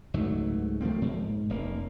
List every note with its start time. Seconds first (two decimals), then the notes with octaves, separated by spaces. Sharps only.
0.14 C#2 G#2 F#3 A3
0.81 F3 A3 A#3 C4
1.02 G#2
1.50 F1 A#3